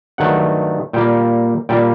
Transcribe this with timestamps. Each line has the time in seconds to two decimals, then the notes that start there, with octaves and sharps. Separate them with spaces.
0.18 G2 D#3 F#3 A3 F#5
0.93 A#2 G3 A#3 G5
1.69 A#2 G3 A#3 G5